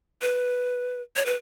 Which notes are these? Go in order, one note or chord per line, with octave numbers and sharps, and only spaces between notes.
B4
C#5
B4